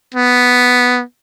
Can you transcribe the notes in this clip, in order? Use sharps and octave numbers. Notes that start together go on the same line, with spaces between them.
B3